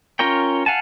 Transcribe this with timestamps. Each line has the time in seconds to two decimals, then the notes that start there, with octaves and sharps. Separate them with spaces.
0.19 C#4 F4 A#4 C#5 G5
0.66 F5 F#5 G#5 A5